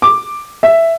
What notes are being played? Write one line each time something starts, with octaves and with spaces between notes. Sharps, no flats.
D6
E5